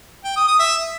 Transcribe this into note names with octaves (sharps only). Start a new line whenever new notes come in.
G5
D#6
D#6
E5